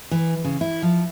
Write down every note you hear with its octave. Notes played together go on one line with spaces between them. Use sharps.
E3
C#3
E4
F3